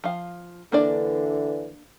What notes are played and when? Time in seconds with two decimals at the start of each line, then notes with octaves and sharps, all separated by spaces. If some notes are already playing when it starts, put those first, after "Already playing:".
0.04 F3 F5
0.72 D3 E3 A#3 D4 D5